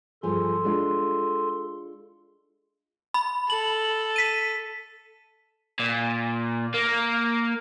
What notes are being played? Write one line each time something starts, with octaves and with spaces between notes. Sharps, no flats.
G2 F3 G#4 A4 C6
G#3 D4 F4
B5
A4 F#7
B6 D#7
A#2
A#3